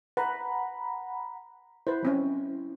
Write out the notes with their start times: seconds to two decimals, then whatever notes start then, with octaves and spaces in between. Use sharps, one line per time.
0.17 B4 F#5 A#5 B5
1.87 E4 B4 C5
2.03 F#3 C4 C#4